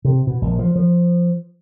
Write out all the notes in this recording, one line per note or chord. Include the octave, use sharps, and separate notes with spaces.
C3
B2
A#1
F3
F3